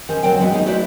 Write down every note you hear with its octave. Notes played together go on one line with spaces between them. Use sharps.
D#3 C#4 C5
D2 C#3 F#3 C4 D5 G5
E3 G#3 B3 F#4 D5
G#3 D#4
A3 E4 F#4 B4 C5 D5